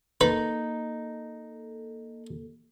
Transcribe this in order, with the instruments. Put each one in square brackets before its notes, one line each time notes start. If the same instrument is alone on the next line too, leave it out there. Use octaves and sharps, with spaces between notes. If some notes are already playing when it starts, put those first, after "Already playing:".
[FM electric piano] A#3 A4 [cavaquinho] D#4 [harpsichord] B4